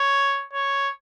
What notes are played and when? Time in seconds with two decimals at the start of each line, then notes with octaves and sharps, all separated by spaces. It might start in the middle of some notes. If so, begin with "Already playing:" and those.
Already playing: C#5
0.53 C#5